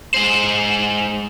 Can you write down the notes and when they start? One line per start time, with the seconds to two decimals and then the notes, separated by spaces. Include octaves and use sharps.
0.14 G#3 C5